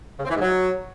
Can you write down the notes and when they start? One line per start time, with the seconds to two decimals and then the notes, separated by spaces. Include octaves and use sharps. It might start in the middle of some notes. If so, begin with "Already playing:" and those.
0.19 C#3
0.25 C4
0.30 E3
0.35 G#2
0.41 F#3